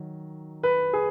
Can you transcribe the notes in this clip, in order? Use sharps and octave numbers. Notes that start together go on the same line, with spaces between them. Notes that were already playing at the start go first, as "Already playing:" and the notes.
Already playing: D#3 F#3
B4
G#4